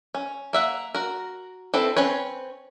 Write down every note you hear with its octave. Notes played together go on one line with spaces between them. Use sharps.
C#4
A#3 E5 F#5
F#4 A#4
C4 E4 A4 B4
C4 C#4 B4 C#5